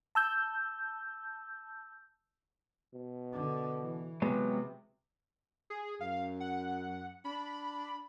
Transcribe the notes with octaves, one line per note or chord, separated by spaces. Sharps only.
A5 E6 G6
B2
D3
E3
C3 F#3 G#3 B3 B4
G#4
F#2 F5
F#5
D4 B5